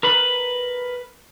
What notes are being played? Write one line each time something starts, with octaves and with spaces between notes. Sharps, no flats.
A#4 B4 B5